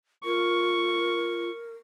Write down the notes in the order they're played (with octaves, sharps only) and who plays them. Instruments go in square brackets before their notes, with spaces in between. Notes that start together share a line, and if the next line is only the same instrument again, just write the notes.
[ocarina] F4 [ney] A#4 [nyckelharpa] C#6